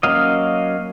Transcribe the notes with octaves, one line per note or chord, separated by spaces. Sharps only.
F#3 A#3 C#4 D#5 F5